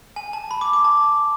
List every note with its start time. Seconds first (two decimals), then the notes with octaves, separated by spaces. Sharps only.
0.16 G#5
0.33 A5
0.51 B5
0.61 D6
0.73 D6
0.85 A5